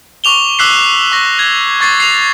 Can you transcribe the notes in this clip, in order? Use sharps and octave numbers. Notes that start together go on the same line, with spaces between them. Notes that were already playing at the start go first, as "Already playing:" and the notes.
C#6 D6 F7 G7
D6 E6 F#6 B6 C7
C#6 A#6
G#6
C#6 A6 C7
C7 F7